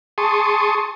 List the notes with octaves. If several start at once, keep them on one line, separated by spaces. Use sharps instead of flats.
G#4 A5 C6 C#6 D#6